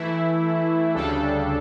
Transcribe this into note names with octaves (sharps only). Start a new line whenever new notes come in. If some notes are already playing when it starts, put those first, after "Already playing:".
Already playing: E3 A3 E4
D2 C#3 G3 D4 A4